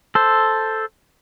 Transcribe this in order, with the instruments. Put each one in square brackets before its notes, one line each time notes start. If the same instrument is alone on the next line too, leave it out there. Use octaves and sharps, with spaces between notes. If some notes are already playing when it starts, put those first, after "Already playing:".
[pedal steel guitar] A4 C5